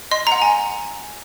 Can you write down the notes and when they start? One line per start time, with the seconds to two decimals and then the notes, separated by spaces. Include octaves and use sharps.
0.11 D#5 C6
0.27 F#5 A#5
0.42 G#5